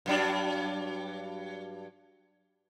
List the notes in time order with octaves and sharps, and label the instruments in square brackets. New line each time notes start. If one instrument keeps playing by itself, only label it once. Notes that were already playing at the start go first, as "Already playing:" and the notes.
[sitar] G2 F#3 D4